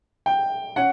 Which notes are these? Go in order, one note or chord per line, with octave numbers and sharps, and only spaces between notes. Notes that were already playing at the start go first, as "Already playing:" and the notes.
G5
C#4 F#5